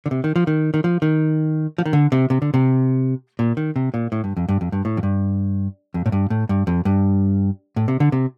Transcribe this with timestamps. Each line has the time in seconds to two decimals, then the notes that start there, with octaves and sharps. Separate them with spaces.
0.06 D3
0.11 C3
0.24 D#3
0.36 F3
0.47 D#3
0.74 D#3
0.84 F3
1.02 D#3
1.78 F3
1.86 D#3
1.93 D3
2.12 C3
2.30 C3
2.42 D3
2.54 C3
3.39 A#2
3.57 D#3
3.76 C3
3.94 A#2
4.12 A2
4.24 G2
4.37 F2
4.49 G2
4.61 F2
4.72 G2
4.85 A2
4.97 F2
5.03 G2
5.94 F2
6.06 A2
6.12 G2
6.30 A2
6.49 G2
6.67 F2
6.85 G2
7.76 A2
7.88 C3
8.00 D3
8.12 C3